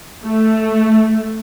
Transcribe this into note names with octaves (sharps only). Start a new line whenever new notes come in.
A3